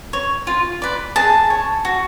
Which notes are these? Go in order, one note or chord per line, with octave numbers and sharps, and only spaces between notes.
C#5
F4
B4 D5
G#4 A5
C#5
F#4